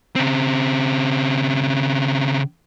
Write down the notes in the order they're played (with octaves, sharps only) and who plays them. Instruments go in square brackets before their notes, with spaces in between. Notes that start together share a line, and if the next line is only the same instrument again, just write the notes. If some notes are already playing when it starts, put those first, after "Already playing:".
[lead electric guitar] C#3 C4